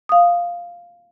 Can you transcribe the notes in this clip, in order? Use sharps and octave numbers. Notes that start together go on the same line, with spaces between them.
F5 D#6